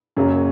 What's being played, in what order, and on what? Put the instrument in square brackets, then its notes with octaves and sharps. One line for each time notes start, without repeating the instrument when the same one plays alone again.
[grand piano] F#1 F#2 C#3 F#3 A#3